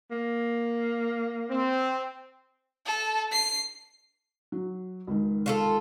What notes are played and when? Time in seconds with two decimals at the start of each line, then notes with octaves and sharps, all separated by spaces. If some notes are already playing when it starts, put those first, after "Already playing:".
0.11 A#3
1.50 C4
2.86 A4
3.32 C7
4.52 F#3
5.07 C#2 G#2 D#3
5.46 F4 F#4 A4